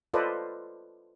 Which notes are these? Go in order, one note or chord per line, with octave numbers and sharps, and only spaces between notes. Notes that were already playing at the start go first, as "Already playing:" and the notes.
F4 A4 B4 C5 D5 D#5